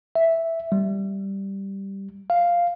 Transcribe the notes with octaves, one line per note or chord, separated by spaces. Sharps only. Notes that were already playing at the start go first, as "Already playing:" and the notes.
E5
G3
F5